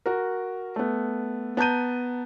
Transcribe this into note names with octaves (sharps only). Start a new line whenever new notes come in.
F#4 A#4
A3 B3
B3 A5 A#5 G6 D#7